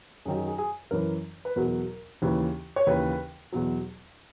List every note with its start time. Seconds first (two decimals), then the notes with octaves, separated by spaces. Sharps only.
0.25 F#2 G#4
0.28 D#3 F#3
0.37 G#4
0.47 G#4
0.58 G#4
0.91 F#2 E3 A#4
1.45 B4
1.56 E2 B2 F#3 A#4
2.22 D#2 C#3 E3
2.76 C#5
2.87 D#2 C#3 E3 B4
3.52 E2 B2 F#3